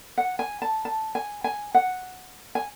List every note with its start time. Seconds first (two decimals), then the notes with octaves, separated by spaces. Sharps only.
0.18 F#5
0.39 G#5
0.62 A5
0.85 A5
1.15 G#5
1.44 G#5
1.74 F#5
2.55 G#5